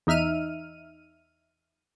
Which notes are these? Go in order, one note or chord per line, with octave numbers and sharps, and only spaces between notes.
E2 D#4 E5 F6 D#7